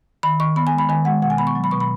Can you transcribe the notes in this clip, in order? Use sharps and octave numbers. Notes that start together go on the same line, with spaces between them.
D#3 B5
D#3 C#6
B3 B5
G#5
G#3
B5
D#3 G#5
G#3 F#5
B2 F#5
G#5
B3 B5
C#6
F#3
B5
B2 C#6
B5